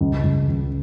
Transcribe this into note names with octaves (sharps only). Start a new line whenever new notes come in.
C#2
C#2
C#2